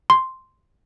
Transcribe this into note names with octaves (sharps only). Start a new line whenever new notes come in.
C6